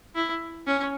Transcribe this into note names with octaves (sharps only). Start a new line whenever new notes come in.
E4
C#4